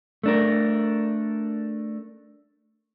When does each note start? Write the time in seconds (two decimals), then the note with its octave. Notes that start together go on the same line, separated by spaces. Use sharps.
0.24 A3 D4 A#4